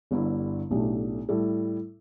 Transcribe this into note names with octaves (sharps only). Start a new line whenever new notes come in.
G1 G2 D3 G3 E4
B1 A2 A3 D4 G4
A2 G3 E4 A4